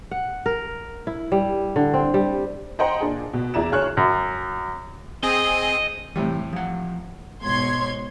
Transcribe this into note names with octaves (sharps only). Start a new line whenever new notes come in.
F#5
A#4
E4
G3
D3
C4
G3
C5 D#5 F#5 G5 A#5 C6
A#2 D4 G#4
B2
E2 E4 D5 A#5 E7
D2 G#4 C#5 C#6 F6 F#6
F#2
C4 G#4 D#5
A2 C3 E3 G3
F3 F#5
G#2 B2 C#5 C6 G#6